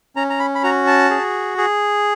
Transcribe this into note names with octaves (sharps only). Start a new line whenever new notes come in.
C#4 A#5
A#5
B5
B5
F#4 A#5
A5
G#4
G#4